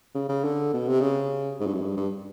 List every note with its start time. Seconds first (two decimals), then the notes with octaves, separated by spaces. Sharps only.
0.15 C#3
0.29 C#3
0.44 D3
0.74 B2
0.88 C3
1.01 C#3
1.60 G#2
1.67 G2
1.74 F#2
1.81 G2
1.97 G2